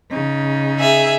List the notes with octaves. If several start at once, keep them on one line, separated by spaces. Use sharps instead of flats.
C#3 D#4
G#4 E5